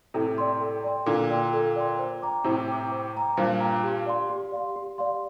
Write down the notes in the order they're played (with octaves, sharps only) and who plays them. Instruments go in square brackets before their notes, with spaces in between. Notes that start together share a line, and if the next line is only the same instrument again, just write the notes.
[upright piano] A2 C3 [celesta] A4
[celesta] D5 G5 C6
A4
D5 G5 C6
[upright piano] A#2 D3 [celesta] A4
[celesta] D5 G5 C6
A4
D5 G5 C6
C5
G5 A#5 D6
[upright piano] A2 C3 [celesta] C5
[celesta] G5 A#5 D6
C5
G5 A#5 D6
[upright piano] G2 A#2 [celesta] C5
[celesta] G5 A#5 D6
G4
D5 F5 C6
G4
D5 F5 C6
G4
D5 F5 C6